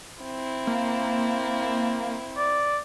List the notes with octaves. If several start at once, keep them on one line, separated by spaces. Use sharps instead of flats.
C4 E4
A#3
D5